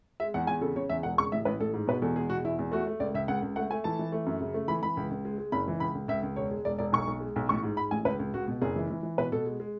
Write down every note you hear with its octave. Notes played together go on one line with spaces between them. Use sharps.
G#3 E5
E2 F#5
E2 G#5
C#3 A4
C#3 C#5
E2 E5
E1 F#5
C#3 C#6
A1 E5
A1 B4
A1 A4
G#2
B2 B4
E2 A4
G#3 G#4
B2 F#4
E2 E4
E2
A3 F#4
A3
C#2 D5
C#2 E5
C#2 F#5
C#2
A3 F#5
A3 G#5
E3 A5
E3
A3
F#2
C#3
A3
E3 B5
E3 B5
C#2
C#2
G#3
G#3
F#1 B5
E3
C#2 B5
C#2
C#2 E5
C#2
E1 C#5
G#3
E1 D5
E1 D5
B1 C#6
B1
G#3
B1
A1 C#6
G#2
G#2 B5
A1 G#5
C#2 B4
C#2
C#2 F#4
B2
F#1 G#4
E3
E3
E3
B2 B4
B2 A4
G#3
G#3